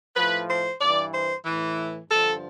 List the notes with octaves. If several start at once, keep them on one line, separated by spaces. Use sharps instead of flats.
A2 F3 B4
C5
G2 E3 D5
C5
A2 E3
G2 D3 F3 A4